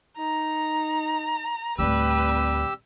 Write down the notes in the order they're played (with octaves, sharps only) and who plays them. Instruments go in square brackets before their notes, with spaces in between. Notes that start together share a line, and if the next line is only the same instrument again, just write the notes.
[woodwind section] D#4 [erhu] A#5
[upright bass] D2 A2 [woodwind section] G3 C4 [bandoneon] G4 E6 [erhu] B4